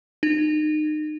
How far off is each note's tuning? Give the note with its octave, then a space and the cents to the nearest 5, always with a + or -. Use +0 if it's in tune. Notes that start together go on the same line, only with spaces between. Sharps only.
D#4 -30